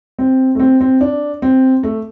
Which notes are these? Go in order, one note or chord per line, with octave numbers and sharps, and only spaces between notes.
C4
A3
C4
C4
D4
C4
A3